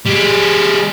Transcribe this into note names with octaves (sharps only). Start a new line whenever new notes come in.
G3 G#4